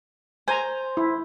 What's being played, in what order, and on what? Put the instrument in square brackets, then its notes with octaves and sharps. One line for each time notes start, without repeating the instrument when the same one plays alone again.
[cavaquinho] C5 [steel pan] G#5 A#5
[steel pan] E4